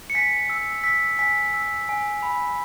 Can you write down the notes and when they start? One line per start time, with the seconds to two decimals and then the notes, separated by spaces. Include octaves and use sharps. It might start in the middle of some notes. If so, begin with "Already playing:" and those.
0.10 C#7
0.15 G#5 B6
0.49 E6
0.84 E6 B6
1.19 G#5 B6
1.54 E6
1.89 G#5
2.23 B5